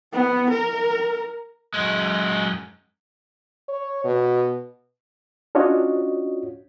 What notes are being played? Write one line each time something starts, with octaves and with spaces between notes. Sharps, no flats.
B3
A#4
F#2 G#3
C#5
B2
C#4 D4 F4 F#4 C#5 D#5